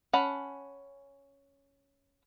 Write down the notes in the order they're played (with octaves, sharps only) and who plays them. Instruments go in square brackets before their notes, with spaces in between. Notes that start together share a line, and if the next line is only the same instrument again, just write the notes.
[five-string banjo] C#4 F#5 A5 B5